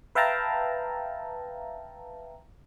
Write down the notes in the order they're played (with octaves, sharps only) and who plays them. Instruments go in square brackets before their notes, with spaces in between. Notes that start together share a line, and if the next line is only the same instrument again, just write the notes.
[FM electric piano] B4 E5 F5 G5 A5 A#5